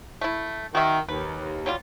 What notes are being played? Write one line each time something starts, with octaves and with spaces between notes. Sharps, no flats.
A3 E4
D#3 F#4 E5
D#2 B4
F#3 G3 F4